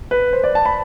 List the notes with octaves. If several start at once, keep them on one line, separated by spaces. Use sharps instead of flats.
B4
C5
D5
A5
B5